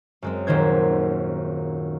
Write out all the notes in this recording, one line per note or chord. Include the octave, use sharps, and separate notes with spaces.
F#2 G#3 C4
D#1 D#2 D#3 C5 G#6